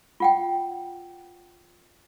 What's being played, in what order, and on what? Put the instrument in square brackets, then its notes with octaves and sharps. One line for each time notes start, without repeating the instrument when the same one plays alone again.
[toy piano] F4 F#5 G5